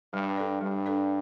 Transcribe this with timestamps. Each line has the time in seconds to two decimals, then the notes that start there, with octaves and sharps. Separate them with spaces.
0.13 G2 G3
0.37 D4 A4 D5
0.61 G2 G3
0.86 D4 A4 D5